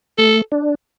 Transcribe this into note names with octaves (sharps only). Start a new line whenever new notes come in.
A3 A4
D4